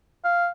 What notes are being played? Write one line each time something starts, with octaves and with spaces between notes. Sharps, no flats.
F5